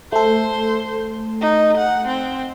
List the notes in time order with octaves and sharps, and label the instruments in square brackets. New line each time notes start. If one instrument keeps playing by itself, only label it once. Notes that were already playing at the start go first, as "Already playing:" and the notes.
[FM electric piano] A3 A4 [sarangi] C5
[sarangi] D#4
F#5
C4